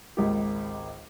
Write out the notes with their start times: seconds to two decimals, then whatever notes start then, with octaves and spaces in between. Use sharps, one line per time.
0.17 G#1 C#2 A#3 G4